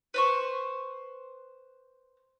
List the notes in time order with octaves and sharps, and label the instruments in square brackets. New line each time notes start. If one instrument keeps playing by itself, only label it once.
[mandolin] B4 C5 C#6